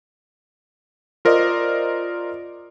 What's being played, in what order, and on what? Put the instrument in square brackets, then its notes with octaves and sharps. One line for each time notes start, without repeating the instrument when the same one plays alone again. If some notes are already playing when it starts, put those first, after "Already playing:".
[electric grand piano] F4 A#4 C5 D5 D#5